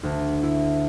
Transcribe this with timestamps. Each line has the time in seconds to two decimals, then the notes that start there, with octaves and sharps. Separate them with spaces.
0.03 D2
0.43 E4